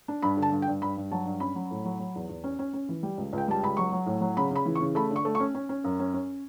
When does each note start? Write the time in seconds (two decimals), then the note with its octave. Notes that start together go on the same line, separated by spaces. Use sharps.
0.08 D4
0.22 G2 B5
0.37 D3
0.42 A5
0.52 G2
0.62 G5
0.68 G2
0.82 G2 B5
0.97 G2
1.11 F#3 A5
1.26 G2
1.40 C#4 B5
1.55 F#3
1.71 A2
1.85 F#3
1.99 F#3
2.15 E2
2.29 E2
2.44 C#4
2.59 C#4
2.73 C#4
2.89 E3
3.03 G3
3.18 C#2
3.33 C#2 G5
3.48 G3 A5
3.63 C#2 B5
3.77 F#3 C#6
3.92 F#3
4.06 A2
4.21 F#3
4.37 C#3 B5
4.51 C#3
4.56 B5
4.66 E3
4.75 C#6
4.80 C#3
4.95 A3 B5
5.11 D3
5.16 C#6
5.25 A3
5.35 C#6
5.40 C#4
5.55 C#4
5.69 C#4
5.84 F#2
5.99 C#4
6.14 C#4